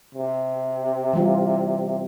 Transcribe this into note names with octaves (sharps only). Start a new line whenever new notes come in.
C3
E3 G3 F4